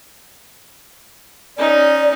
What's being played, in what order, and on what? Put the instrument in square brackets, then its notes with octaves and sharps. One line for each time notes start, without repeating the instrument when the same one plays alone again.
[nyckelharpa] C#4 D#4 [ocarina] D5